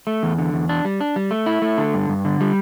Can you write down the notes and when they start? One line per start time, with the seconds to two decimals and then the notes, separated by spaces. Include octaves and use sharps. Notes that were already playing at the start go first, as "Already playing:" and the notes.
0.07 A3
0.23 E2
0.38 D3
0.54 E2
0.69 D4
0.85 G3
1.01 D4
1.16 G3
1.31 A3
1.46 E4
1.62 A3
1.78 D3
1.94 G2
2.09 G2
2.25 D3
2.41 G3